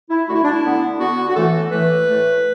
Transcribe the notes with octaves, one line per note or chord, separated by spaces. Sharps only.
E4
D3 A3 F#4
E4
D4
E4
D3 B3
D3 B3 F#4
F#4
A2 E3 A3 A4
A2 E3 A3 B4
A2 A3